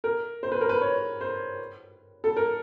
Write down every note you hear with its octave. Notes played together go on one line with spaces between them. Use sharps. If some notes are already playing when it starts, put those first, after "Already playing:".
A#4
C5
B4
A#4
B4
C#5
C5
A4
A#4